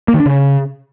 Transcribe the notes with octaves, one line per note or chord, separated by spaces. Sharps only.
A#3
D#3
D4
C#3